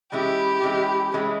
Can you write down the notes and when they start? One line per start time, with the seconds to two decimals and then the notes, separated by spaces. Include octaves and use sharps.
0.12 E3 G#3 C#4 E4 G4
0.62 E3 G#3 C#4 E4
1.13 E3 G#3 C#4 E4